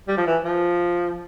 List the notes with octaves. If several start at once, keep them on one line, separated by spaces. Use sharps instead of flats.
G3
F3
E3
F3